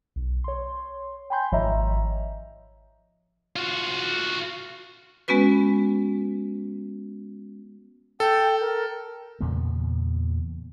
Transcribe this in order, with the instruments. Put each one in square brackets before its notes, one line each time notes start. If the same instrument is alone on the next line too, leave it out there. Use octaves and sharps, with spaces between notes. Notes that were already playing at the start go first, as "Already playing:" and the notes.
[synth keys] B1
C#5 C6
G5 G#5 B5 C6 G6
G#1 F3 C#5 D#5 E5 A#5
[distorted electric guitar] F4 F#4
[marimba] G#3 B3 C#4 F#4 B4
[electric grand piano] A4 [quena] G5
[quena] A#4
[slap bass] E2 A#2 C#3 B3